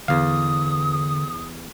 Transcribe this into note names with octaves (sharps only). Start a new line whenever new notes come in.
E2 D3 F5 D#6